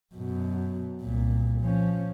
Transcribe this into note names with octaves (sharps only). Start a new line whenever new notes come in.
F#2 B2
C2 A#2
F3 C#4